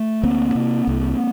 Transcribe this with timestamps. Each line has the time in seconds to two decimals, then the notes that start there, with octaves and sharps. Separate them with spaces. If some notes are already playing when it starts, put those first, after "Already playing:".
Already playing: A3
0.23 D2 A#3 C4
0.55 C3
0.87 C2